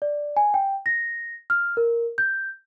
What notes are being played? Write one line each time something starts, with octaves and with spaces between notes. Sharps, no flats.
D5
G#5
G5
A#6
F6
A#4
G6